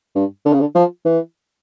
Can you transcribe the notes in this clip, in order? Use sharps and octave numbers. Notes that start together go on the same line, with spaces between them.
G2
D3
C#3
D3
F3
E3